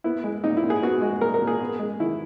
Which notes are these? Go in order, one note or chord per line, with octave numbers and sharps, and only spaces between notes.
B3 E4
G#3
A#2 D#4
E4
A#2
G#4
B3 F#4
G#3
A#2 A#4
A#4
A#2
G#4
B3
G#3
D#3 E4